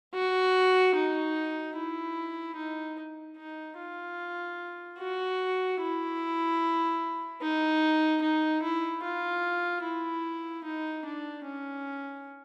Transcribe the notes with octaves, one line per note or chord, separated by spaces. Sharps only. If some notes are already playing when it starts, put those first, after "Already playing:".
F#4
D#4
E4
D#4
D#4
F4
F#4
E4
D#4
D#4
E4
F4
E4
D#4
D4
C#4